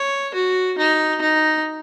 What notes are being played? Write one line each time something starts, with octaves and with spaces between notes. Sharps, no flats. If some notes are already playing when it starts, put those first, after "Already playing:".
Already playing: C#5
F#4
D#4
D#4